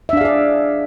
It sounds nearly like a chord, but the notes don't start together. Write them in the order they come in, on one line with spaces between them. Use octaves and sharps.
E5 D4 F5 G#4 D5